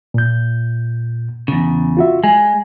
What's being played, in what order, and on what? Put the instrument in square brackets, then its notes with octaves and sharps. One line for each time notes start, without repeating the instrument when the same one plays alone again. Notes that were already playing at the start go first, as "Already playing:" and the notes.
[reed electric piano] A#2 G6
[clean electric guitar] E2 C#3
[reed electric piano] F4 F#4 E5
[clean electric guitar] G#3 [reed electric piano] G#5